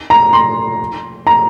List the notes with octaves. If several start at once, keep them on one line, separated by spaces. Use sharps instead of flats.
A#5
C6
A#5